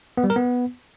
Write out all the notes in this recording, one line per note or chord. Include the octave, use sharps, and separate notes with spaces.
B3
G3
A#4
B3